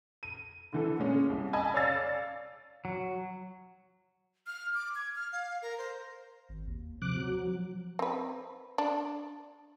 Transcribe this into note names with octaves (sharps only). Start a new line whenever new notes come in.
D#7
D3 E3 A4
A#2 G#3 C#4
C2
D#5 G#5 A5 B5 G#6
C#5 D5 F5 E6 A6
F#3
F6
D6
G#6
F6
F5
A#4
C5
G#1
D#2
C3 F3 D6 F#6
F#3
C4 B4
D4